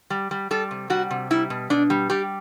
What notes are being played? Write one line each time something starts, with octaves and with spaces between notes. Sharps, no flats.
G3
G3
G3 A4
C3
G3 F#4
C3
G3 E4
B2
B2 D4
G3
G3 G4